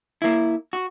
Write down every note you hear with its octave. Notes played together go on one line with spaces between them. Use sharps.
A#3 E4
F#4